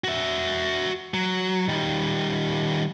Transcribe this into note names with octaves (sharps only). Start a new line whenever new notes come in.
F#4 E5
F#3
D#3 G3